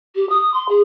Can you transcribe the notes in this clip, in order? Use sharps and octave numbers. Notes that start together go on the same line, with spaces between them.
G4
D#6
C6
G#4